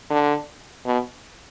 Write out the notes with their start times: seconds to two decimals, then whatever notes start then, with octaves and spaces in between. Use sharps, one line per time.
0.10 D3
0.86 B2